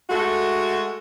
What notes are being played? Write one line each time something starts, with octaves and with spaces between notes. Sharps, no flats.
G#3 A3 F#4 A4